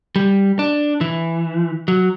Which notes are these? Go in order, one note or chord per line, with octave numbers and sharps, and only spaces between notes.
G3
D4
E3
F#3